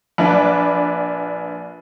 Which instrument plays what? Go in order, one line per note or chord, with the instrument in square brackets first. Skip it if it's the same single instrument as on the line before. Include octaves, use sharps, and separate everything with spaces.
[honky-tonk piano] A#1 D4 B4